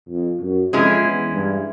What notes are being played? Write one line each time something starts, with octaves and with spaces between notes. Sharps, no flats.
F2
F#2
F2 E3 G#3 C#4 E4 G#4
E2
G2